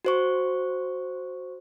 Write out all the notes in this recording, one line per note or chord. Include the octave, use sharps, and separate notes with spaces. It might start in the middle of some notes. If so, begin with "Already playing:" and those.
F#4 C5 C#6